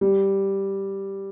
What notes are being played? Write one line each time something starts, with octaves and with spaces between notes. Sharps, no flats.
G3